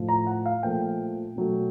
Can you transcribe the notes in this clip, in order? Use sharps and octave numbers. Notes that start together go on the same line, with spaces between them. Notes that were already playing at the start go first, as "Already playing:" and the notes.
Already playing: A2 F3 A3
A#5
F#5
F5
A#2 F3 A3 G5
B2 F#3 A3